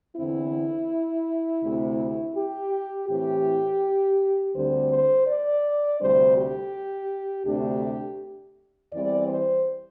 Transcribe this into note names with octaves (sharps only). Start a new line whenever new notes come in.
E2 D3 C4 E4
D2 C3 A3
G4
A2 E3 C4 G4
D2 D3 G3 C4 C5
C5
D5
D2 C3 G3 D4 C5
G4
D2 C3 A3 D4 G4
E2 E3 G3 C4 D5
C5